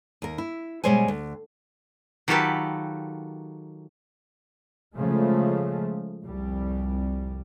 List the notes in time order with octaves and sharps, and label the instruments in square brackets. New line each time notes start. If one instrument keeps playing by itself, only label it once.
[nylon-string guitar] D#2 A#4
E4
B2 G3 G#3 C5 C#5 G#5
D2
[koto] D#3 F#3 F4 G4 A4 B4
[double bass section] C#3 F3 G#3 A3
C2 F2 G3